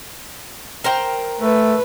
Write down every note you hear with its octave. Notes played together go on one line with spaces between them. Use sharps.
A#4 C5 G5
A3 B4